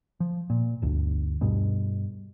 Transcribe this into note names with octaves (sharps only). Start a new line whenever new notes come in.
F3
A#2
G1 D2
G2 B2